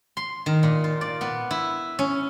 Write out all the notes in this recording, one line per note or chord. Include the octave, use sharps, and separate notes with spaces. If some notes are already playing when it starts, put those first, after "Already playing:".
C6
D#3
A#2
F4
D5
B3
E4
C#4